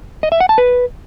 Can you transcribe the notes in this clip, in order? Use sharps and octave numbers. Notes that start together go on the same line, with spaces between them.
D#5
E5
F#5
A5
B4